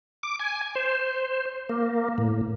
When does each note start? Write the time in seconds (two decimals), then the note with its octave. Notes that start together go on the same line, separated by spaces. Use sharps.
0.23 D6
0.39 G#5
0.75 C5
1.70 A#3
2.18 A2